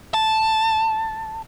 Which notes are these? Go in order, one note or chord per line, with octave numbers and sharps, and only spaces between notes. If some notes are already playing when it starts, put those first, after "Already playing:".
A5